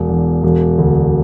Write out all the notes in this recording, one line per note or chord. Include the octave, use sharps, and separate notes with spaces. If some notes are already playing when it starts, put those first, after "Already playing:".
Already playing: E1
E2
E1
D2